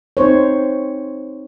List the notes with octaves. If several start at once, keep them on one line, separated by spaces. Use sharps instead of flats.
C4 D#4 C5 C#5